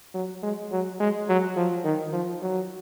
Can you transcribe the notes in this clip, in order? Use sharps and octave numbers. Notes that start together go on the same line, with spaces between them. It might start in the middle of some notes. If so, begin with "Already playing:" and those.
F#3
G#3
F#3
G#3
F#3
F3
D#3
F3
F#3